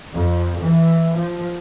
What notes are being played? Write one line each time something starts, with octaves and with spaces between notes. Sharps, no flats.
F2
E3
F3